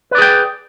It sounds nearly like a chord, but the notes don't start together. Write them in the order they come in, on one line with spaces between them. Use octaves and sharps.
B4 D5 G#4 G5